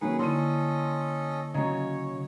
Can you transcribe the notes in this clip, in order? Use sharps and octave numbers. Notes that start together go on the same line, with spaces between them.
D#3 F#3 A#3 C#4 G#4 B4
D3 C#4 E4 A4 D#5 C6 D#7
C#3 F#3 C#5 D#5 A#5